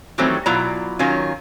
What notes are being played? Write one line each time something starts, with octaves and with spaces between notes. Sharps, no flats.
D#3 E3 F#3 G3 A3 C4
B2 F#3 E4 F4 D5 A#5
D#3 F#3 C#4 F4